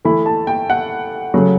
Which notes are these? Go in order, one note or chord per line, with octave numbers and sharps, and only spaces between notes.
E3 A3 E4 B5
A5
G5
F#5
C#3 F#3 A3